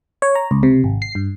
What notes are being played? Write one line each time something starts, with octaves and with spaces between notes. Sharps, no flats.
C#5
A#5
C#2
C3
G#1
C7
G2